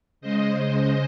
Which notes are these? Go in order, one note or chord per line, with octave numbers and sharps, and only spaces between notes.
C#3 G#3 C5 D#5